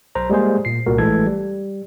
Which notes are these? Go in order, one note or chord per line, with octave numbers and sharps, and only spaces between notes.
B1 C5 A#5
G3 G#3 A#3 G#4 C5
A#2 C7
C2 A#2 F#4 A#4
A1 E3 G#3 A3 A4 G#6
G3